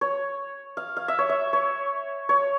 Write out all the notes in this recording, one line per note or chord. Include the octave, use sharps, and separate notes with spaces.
C#5
F5
F5
E5
C#5
E5
C#5
C#5